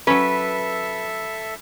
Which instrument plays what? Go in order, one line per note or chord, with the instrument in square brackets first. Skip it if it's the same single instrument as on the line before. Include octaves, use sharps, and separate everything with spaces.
[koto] F#3 C#4 [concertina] A4 E5 [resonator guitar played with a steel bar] B4